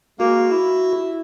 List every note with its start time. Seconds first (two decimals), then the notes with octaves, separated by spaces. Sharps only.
0.20 G#3 A#3 F#4
0.51 E4